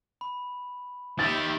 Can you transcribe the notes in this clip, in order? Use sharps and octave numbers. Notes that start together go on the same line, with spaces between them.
B5
D#3 G4 E5 G5 A6